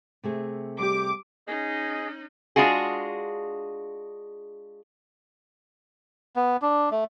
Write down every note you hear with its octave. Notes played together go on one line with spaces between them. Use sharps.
C3 A3 G#4
G3 G4 D6
C#4 D#4 G#4 D#5
G#3 D4 F4 F#4 G#4
B3
D4
A3